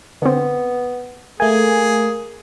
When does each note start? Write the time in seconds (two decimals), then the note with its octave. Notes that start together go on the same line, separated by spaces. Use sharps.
0.22 D3 B3 C4
1.40 A3 A#3 G#4 G#5